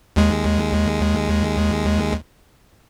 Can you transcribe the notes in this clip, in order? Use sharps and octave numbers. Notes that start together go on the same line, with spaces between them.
D#2 G#3